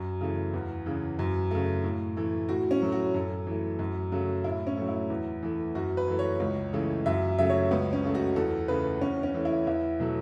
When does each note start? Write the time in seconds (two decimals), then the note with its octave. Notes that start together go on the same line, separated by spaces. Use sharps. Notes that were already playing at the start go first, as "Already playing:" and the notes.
Already playing: F#2
0.21 C#3 E3 A3
0.54 E2
0.86 C#3 E3
1.19 F#2
1.51 C#3 A3
1.84 A2
2.17 E3 A3
2.49 A2 F#4
2.71 C#4
2.82 F#3 A3
2.92 F#4
3.14 F#2 A4
3.47 E3 A3
3.79 F#2
4.12 C#3 F#3 A3
4.44 A2 E4
4.67 C#4
4.77 F#3 A3
4.89 E4
5.10 E2
5.43 E3 A3
5.75 F#2 F#4
5.97 B4
6.08 E3 A3
6.19 C#5
6.40 C#2
6.73 C#3 E3 A3
7.06 F#2 E5
7.39 C#3 F#3 A3 E5
7.49 C#5
7.71 C#2 B3
7.93 C#4
8.04 C#3 A3
8.15 F#4
8.36 E2 A4
8.68 C#3 A3 B4
9.01 E2 C#4
9.23 C#4
9.34 E3 A3
9.45 E4
9.67 E2 E4
10.00 B2 F#3 A3